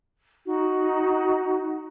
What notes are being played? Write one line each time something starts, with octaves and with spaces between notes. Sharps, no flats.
D#4 F#4